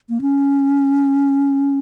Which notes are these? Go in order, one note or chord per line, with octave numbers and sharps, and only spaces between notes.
A#3
C#4